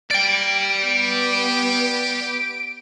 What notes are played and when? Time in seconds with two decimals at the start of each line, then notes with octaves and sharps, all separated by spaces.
0.11 A#3 D5 G5 D7
0.82 B3 G4